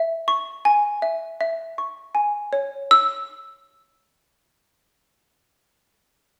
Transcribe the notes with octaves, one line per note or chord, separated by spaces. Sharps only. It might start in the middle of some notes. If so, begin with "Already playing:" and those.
Already playing: E5
C#6
G#5
E5
E5
C#6
G#5
C#5
E6